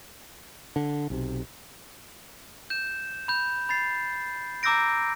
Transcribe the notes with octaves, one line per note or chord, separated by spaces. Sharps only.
D3
B1 C3
G6 E7
B5 G6
B5 A6 C7
A#5 D6 E6 G6 A#6 D7